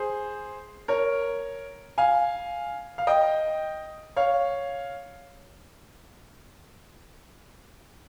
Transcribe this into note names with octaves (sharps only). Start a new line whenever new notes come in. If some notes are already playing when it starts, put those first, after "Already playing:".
Already playing: G#4 C5
A#4 C#5
F5 G#5
F5
D#5 G5
C#5 F5